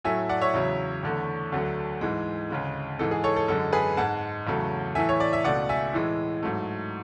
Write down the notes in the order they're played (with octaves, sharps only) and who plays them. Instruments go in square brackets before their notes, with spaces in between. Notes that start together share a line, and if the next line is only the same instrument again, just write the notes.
[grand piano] A2 F#3 A3 E5 G#5
D5 F#5
C#5 E5
E2 C#3 F#3
E2 D3 A3
D2 D3 F#3 A3
G#2 E3 G#3
D2 C#3 G#3
G#2 E3 G#3 A4
G#4
A4 C#5
A4
F#2 D3 G#3 A4
G#4 B4
G#2 G#3 F#5 A5
E2 C#3 F#3 A3
A2 E3 A3 E5 G#5
C#5
D5
E5
C#2 B2 A3 D5 F#5
E5 G#5
A2 E3 G#3
G#2 F#3 A3